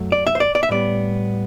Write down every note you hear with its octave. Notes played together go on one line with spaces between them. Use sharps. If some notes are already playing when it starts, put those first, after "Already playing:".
Already playing: F#2 F#3 A3
D5
E5
C5
D5
D5
E5
A2 G3 B3 D5